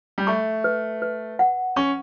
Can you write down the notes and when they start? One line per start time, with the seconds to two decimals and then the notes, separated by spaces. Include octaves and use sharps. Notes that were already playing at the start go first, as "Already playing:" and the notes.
0.18 G3
0.27 A3 C#6
0.64 B4
1.02 B4
1.39 F#5
1.76 C#4 C#6